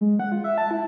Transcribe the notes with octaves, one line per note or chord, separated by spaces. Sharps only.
G#3
F#5
F4
E5
A5
E4